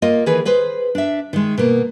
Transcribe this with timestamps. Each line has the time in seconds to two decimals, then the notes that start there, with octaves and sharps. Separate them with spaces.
0.02 A#3 F4 D#5
0.26 D#3 E3 G#4 B4
0.45 G#4 B4 C5
0.95 D4 E5
1.33 D#3 G#3
1.58 B2 A#3